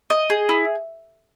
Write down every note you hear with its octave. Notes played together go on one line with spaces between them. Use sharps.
D#5
G#4
E4